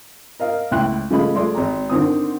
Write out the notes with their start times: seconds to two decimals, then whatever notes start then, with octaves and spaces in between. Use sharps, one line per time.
0.40 A#4 D#5 F5
0.71 C#2 A2 E4 G5 C6 F#6
1.10 C#3 F3 G#3 A3 D#5 B5
1.34 F3 G#3 A3 D5 C6
1.55 G#1 A#5
1.90 D3 D#3 C4 D#6